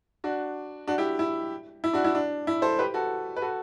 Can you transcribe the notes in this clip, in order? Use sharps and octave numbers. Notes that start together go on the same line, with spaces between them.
D4 F#4
D4 F#4
E4 G4
E4
E4
D4 F#4
E4
D4
E4
A4 C5
G4 B4
F#4 A4
B4
F#4 A4